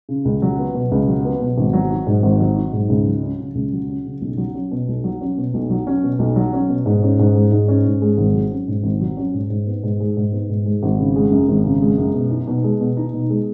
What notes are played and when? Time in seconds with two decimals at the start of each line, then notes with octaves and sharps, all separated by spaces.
0.09 C#3
0.25 C#2
0.42 F#3
0.58 B3
0.74 B2
0.91 C#2
1.08 F#3
1.25 B3
1.41 B2
1.58 G#1
1.73 F#3
1.91 D#4
2.07 G#2
2.23 G#1
2.40 F#3
2.56 D#4
2.73 G#2
2.89 C#2
3.07 F#3
3.23 C#4
3.39 C#3
3.55 C#2
3.73 F#3
3.88 C#4
4.06 C#3
4.21 B1
4.38 F#3
4.55 C#4
4.71 B2
4.88 B1
5.04 F#3
5.21 C#4
5.38 B2
5.54 B1
5.70 F#3
5.87 C#4
6.03 B2
6.19 B1
6.36 F#3
6.53 C#4
6.69 B2
6.86 G#2
7.03 C#4
7.19 G#2
7.35 G#3
7.52 G#2
7.68 C#4
7.85 G#2
8.02 G#3
8.18 G#1
8.34 F#3
8.51 C#4
8.68 G#2
8.84 G#1
9.01 F#3
9.17 C#4
9.34 G#2
9.50 G#2
9.67 B3
9.83 G#2
10.00 G#3
10.17 G#2
10.32 B3
10.50 G#2
10.66 G#3
10.83 G#1
10.99 C#3
11.16 G#3
11.31 F#2
11.49 G#1
11.65 C#3
11.82 G#3
11.98 F#2
12.15 B2
12.30 D#4
12.47 B2
12.64 G#3
12.81 B2
12.97 D#4
13.14 B2
13.30 G#3